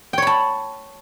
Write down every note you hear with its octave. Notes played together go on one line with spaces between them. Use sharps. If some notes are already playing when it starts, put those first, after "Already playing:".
C#5 G5 A5 B5